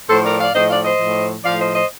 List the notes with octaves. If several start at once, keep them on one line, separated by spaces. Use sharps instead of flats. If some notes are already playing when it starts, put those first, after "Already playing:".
A2 F3 A4 C5
A#4 D5
D5 F5
A2 F3 C5 D#5
D5 F5
C5 D#5
A2 F3
A2 F3 D5 F5
C5 D#5
C5 D#5